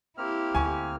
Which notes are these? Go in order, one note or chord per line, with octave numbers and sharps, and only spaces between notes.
A#3 C4 E4 G4 F6
D2 G#5 C#6